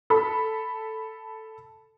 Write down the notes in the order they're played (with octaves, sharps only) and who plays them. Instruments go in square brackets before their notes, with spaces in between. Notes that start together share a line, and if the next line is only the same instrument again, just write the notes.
[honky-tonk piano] A4 B5